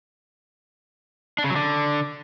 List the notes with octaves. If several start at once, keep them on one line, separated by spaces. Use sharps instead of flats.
D4
C#3
F#3
D3